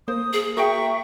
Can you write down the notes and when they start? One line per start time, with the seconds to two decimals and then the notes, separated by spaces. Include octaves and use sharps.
0.08 A#3 C5 D#6
0.33 G#4
0.57 F#4 A#4 E5 G5 C#6